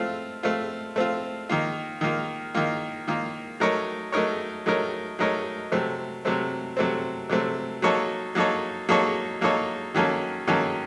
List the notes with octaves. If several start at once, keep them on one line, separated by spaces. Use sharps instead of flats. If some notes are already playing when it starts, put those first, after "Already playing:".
Already playing: A3 C4 F4
A3 C4 F4
A3 C4 F4
D#3 A#3 F4
D#3 A#3 F4
D#3 A#3 F4
D#3 A#3 F4
F#3 A3 D#4 A#4 C#5
F#3 A3 D#4 A#4 C#5
F#3 A3 D#4 A#4 C#5
F#3 A3 D#4 A#4 C#5
C3 F#3 A3 C4
C3 F#3 A3 C4
C3 F#3 A3 C4
C3 F#3 A3 C4
F#3 A#3 D#4 A4 C#5
F#3 A#3 D#4 A4 C#5
F#3 A#3 D#4 A4 C#5
F#3 A#3 D#4 A4 C#5
D#3 F#3 A#3 C#4 A4
D#3 F#3 A#3 C#4 A4